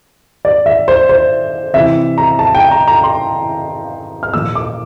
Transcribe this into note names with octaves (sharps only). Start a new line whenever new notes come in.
D5
E5
C5
C5
C3 E3 E5
A#5
A5
G5
A#5
A#5
C6
F6
A#2 F3 E6
D6